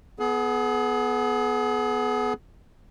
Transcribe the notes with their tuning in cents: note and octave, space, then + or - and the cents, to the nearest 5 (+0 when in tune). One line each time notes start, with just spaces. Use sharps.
B3 +0 G#4 +35